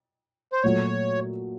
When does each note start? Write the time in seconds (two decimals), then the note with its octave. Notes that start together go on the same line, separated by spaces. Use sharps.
0.52 C5
0.63 A#2 F#3 A3 C#5